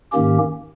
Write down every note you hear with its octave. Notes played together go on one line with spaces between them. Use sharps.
G#2 D#3 A#3 C#4 G4